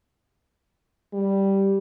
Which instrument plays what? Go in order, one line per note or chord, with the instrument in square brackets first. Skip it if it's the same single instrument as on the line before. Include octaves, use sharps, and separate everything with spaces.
[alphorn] G3